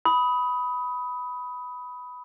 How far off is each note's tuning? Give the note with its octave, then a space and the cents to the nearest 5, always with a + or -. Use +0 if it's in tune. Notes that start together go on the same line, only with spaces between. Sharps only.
B5 +0 D#6 +20